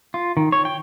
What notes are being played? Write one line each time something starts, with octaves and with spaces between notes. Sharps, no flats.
F4
D#3
C#5
G5